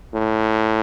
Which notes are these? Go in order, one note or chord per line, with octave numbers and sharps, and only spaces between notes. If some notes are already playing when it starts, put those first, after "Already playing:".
A2